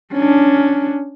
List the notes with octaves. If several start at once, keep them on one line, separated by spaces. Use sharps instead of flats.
C#4 D4